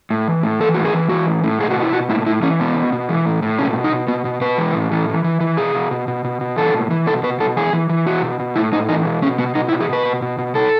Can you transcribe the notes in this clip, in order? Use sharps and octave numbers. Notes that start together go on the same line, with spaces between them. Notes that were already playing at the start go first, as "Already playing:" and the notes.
A2
E3
A2
E3 A4
A2 F#4
G#4
E3
E3 F#4
A2
A2
B2 G#4
F#4
B2
E4
B2 F#4
A2 E4
A2 E4
E3 C#4
B2 B3
B2
B2
E3
A2
A2
B2 C#4
B2
D#4
B2
B2 B3
B2
B2 B4
E3
A2
E3
E3
E3
E3
B2 G#4
B2
B2
B2
B2
B2
E3 A4
A2
E3
B2 A4
B2 B4
B2 A4
E3 G#4
E3
E3
B2 F#4
B2
B2
A2 E4
A2 D#4
E3 D#4
B2
B2 C#4
B2 B3
B2 D#4
E4
B2
G#4
B2 B4
B2
B2
B2
B2 A4